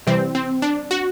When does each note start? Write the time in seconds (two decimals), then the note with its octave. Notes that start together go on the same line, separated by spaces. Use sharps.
0.07 C3 E3 G3 C4
0.35 C4
0.62 D4
0.91 F#4